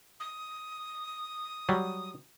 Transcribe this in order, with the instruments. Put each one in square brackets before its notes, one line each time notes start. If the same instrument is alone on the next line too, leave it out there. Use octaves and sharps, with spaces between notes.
[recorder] D#6
[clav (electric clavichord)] F#3 G3